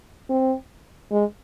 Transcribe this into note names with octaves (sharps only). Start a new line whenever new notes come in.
C4
G#3